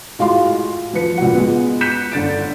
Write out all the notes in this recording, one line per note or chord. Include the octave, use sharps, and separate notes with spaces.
A2 G#3 F4 F#4 F5 C6
F3 B4 C#7
C#2 A#2 F#4 F#5
G#3 B3
F#6 G6 B6 C#7 E7
G1 D3 A6 D7